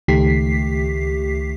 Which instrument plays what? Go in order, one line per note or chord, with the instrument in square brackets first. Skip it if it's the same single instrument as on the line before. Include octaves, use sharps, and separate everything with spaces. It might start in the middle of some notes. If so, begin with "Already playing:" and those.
[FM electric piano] C#2 D#3 A3 G4 B6 C7